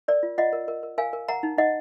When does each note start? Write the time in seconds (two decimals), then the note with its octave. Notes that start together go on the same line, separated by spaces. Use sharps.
0.08 A#4 D5
0.23 F4
0.38 F4 D#5 F#5
0.53 A#4
0.68 A#4
0.83 A#4
0.98 A#4 F5 G#5
1.13 A#4
1.28 A#4 F#5 A#5
1.43 D#4
1.58 D#4 D#5 F#5